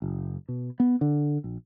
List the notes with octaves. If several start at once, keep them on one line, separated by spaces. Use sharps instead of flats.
F#1
B2
B3
D3
A#1